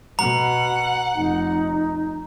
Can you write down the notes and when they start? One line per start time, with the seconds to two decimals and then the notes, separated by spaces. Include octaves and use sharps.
0.19 B2 F#5 A#5
1.16 F1 D#4